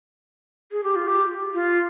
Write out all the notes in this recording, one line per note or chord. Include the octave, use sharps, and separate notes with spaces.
G#4
G4
F4
G4
F4